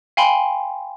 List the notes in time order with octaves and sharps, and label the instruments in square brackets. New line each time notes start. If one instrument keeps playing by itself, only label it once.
[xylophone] F5 G5 G#5 B5 C6